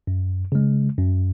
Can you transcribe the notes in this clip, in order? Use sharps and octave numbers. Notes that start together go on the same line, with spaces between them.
F#2
C#3 G#3
F#2